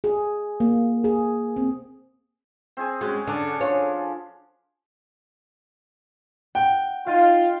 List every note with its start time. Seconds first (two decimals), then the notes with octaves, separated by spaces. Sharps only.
0.04 G#4
0.60 A#3
1.04 G#4
1.57 C4
2.77 C4 G#4 G#5
3.01 G#3 C#4 F#4
3.27 D3 C#4 D4
3.61 F3 C#5
6.55 F#5 G5
7.07 D#4 F4 F5 A6 D#7